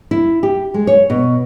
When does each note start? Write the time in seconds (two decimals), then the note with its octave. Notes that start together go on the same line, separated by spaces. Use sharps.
0.11 E4
0.43 G4
0.74 G#3
0.87 C#5
1.10 B2